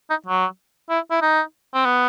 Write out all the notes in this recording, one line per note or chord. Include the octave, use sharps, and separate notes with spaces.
D#4
F#3
E4
E4
D#4
C4
B3